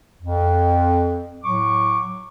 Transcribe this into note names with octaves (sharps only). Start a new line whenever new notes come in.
F2
A2 F#3 C#6 D6